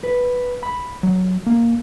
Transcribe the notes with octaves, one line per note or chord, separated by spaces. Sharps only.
B4
B5
F#3
A#3